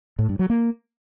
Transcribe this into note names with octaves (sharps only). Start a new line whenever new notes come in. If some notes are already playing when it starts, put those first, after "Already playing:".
A2
G2
F#3
A#3